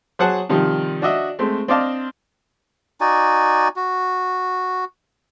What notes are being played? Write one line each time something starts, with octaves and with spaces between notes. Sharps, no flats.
F#3 G#4 C5 F#5 A5
C3 D#3 F3 G3
D4 F#4 D#5 E5
G#3 A3 C4
C4 D4 D5 D#5 F5 A5
D#4 F#4 D5 G#5
F#4